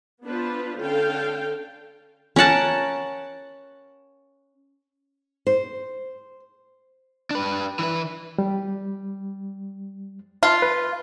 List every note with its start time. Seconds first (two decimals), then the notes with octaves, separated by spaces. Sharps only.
0.25 B3 D4 F4 B4 C5
0.78 D3 C#4 A4 F5 G5
2.36 C#4 A#4 F#5 A5
5.47 C5
7.31 D4 B4
7.79 E3 B4
8.38 G3
10.43 F4 A5
10.62 B4